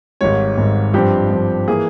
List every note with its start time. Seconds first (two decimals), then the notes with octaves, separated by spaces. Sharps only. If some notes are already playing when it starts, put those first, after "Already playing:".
0.21 G#1 G#2 G3 C#5
0.58 G#1 G#2 G3
0.94 G2 F3 C4 G4
1.30 G2 F3 C4
1.68 E3 A#3 G#4